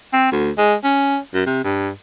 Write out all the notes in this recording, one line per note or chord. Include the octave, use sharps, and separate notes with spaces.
C4
D2
G#3
C#4
F#2
C3
G2